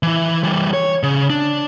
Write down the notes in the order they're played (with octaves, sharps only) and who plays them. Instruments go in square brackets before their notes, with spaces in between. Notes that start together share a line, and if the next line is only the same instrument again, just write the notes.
[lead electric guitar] E3 E4
E3 G3
C#5
C#3
D4